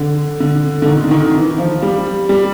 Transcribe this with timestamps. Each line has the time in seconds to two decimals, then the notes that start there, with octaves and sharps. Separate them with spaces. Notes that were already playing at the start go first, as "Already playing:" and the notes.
Already playing: D3
0.40 D3
0.82 D3
0.88 D#3
1.04 D3
1.11 D#3
1.35 E3
1.58 F3
1.82 G3
2.29 G3